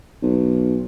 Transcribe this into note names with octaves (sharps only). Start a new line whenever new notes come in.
B1